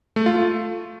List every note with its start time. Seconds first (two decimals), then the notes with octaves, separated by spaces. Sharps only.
0.16 A3
0.26 F4
0.36 A3